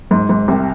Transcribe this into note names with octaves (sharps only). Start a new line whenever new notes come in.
G#1 G#2
G#1 G#2
C2 C3